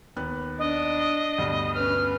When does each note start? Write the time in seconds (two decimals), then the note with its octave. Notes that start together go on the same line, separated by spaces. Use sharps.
0.16 D#2 B3 F#6
0.59 D4 D#5
1.38 D2 G2 B2
1.74 C#4 B4 F6